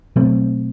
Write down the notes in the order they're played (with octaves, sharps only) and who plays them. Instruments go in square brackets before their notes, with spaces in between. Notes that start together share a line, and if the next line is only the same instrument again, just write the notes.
[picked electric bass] B2 F#3 A3 C4